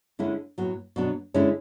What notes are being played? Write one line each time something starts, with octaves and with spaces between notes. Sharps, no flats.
D3 G#3 C#4 E4
A2 F#3 B3
B2 F#3 B3 D4
D3 G#3 C#4 E4